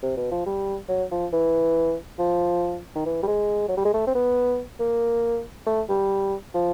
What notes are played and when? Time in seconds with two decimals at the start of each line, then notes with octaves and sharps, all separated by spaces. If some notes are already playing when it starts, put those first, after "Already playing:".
0.02 C3
0.17 B2
0.31 F3
0.46 G3
0.88 F#3
1.11 F3
1.33 E3
2.19 F3
2.95 D#3
3.05 E3
3.23 G3
3.27 G#3
3.68 F#3
3.77 G3
3.85 G#3
3.93 A3
4.07 C4
4.15 B3
4.80 A#3
5.66 A3
5.89 G3
6.54 F3